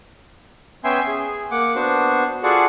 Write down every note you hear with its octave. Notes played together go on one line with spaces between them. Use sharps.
B3 C#4 E5 G5 G#5 C6
G#4
A#3 F#5 D6
B3 D4 F#4 C5
F4 F#4 G#4 A4 D5 F#5